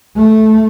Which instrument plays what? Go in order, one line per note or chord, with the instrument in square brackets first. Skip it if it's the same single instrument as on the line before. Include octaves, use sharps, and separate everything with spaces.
[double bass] A3